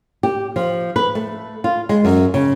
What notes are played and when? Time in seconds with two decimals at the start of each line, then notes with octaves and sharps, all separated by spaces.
0.23 G4
0.56 F3
0.96 B4
1.15 A3
1.64 F4
1.89 G#3
2.05 F#2
2.34 C#3